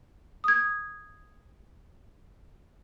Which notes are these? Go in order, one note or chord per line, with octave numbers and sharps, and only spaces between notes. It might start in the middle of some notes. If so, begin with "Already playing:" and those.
D#6 G#6